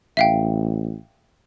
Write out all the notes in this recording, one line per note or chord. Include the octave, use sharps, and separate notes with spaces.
A1 E5 F5 G5